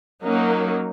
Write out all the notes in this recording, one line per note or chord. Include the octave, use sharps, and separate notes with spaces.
F#3 A#3 C#4 D#4